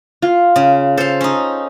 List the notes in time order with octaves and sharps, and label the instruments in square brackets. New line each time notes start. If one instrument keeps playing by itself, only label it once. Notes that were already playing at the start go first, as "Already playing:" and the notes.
[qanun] F4
[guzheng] C#3
[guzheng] A4 F5 [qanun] C5
[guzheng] C#4 D#4